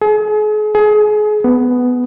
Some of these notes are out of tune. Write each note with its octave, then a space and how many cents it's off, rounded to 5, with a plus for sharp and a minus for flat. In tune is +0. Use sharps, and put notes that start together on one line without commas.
G#4 +40
G#4 +30
B3 +10